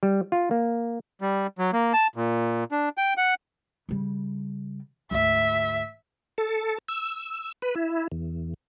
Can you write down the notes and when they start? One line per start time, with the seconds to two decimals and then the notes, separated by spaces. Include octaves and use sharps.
0.03 G3
0.32 F4
0.51 A#3
1.21 G3
1.59 F#3
1.73 A#3
1.93 A5
2.16 A#2
2.72 D4
2.98 G5
3.17 F#5
3.89 C#3 G3
5.11 D2 G#2 E5
6.38 A4
6.88 E6
7.62 B4
7.75 E4
8.12 E2